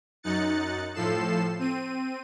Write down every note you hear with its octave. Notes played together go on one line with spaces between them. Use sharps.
F#2 D#4 F#6 A6 C#7
A2 F3 A4 C7 E7
C4 D#7